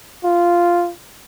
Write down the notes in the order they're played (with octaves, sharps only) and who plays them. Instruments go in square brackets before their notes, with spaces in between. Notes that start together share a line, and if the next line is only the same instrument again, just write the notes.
[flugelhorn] F4